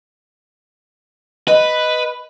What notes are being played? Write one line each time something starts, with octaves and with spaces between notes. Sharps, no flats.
B4 D#5